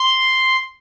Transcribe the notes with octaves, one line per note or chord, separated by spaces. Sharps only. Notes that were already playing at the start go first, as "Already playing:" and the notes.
Already playing: C6